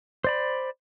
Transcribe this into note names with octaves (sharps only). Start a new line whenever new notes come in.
C5 D5 B5